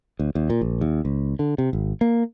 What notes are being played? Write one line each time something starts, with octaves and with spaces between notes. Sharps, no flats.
D2
D#2
A#2
A#1
D#2
C#2
D3
C3
G#1
A#3